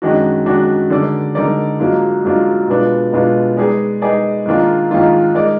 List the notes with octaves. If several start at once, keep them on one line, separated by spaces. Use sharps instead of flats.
F#2 D#3 G#3 D4 F#4
F#2 D#3 G#3 D4 F#4
D3 G#3 D#4 A#4 D5
D3 G#3 D#4 A#4 D5
G#2 F#3 A#3 D4 F4
G#2 F#3 A#3 D4 F4
B2 G#3 B3 D4 F4
B2 G#3 B3 D4 F4
G#3 D#4 G#4 B4 D5
G#3 D#4 G#4 B4 D5
G#2 D#3 A#3 D4 F4
G#2 D#3 A#3 D4 F4
G#3 D#4 A#4 D5